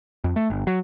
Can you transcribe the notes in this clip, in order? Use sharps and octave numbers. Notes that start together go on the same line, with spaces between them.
F2
A3
G1
F#3